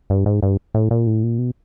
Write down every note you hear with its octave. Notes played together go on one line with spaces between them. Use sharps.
G2
G#2
G2
A2
A#2
A2
A#2
B2